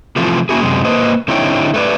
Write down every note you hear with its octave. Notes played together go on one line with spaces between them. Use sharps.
C3 E3 F3 A3 F4
A#3 C#4 E4 F#4 G#4
F#2 C3 G#3
A#3 B4 C5 D#5
D3 C4 D#4 E4 C#5 G5
A3 B4 D5